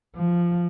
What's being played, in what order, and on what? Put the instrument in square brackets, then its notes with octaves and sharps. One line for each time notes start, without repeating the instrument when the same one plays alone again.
[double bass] F3